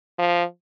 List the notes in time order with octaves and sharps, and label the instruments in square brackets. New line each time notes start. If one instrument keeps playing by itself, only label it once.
[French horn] F3